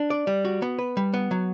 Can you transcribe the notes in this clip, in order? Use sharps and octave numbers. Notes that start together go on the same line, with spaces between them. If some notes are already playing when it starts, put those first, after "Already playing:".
Already playing: D4
D5
G3
F#4
B3
B4
G3
B3
F#3